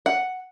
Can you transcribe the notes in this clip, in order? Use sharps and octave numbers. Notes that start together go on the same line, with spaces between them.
F#5